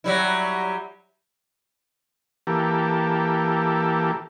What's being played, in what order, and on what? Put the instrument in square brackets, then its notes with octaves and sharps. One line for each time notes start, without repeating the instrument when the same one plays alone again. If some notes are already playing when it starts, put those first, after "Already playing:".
[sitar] F#3 G3 E4
[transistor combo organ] E3 A#3 G4 A4